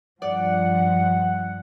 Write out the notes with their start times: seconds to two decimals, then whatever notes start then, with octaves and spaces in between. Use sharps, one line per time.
0.22 G2 F3 G3 D5 F#5